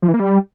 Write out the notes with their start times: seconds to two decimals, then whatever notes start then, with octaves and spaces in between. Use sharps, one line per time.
0.02 F3
0.08 E3
0.14 A#3
0.19 G3